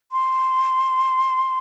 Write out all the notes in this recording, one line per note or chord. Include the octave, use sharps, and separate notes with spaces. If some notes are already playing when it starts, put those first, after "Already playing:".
C6